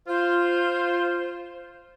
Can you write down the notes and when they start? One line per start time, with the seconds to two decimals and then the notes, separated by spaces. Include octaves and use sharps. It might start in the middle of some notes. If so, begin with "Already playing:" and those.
0.07 F4 C5